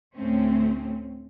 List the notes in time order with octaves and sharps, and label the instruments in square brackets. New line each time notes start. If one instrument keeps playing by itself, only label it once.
[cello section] D2 A2 A3 C4 C#4